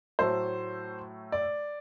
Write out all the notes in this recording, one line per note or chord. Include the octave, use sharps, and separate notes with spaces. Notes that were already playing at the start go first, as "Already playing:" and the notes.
A2 F#3 A3 C5
D5